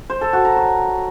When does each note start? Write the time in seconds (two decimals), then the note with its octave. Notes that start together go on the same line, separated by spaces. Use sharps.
0.10 C5
0.21 A4
0.33 F#4
0.45 A#5
0.56 C#5